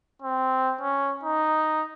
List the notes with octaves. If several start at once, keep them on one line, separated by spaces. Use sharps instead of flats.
C4
C#4
D#4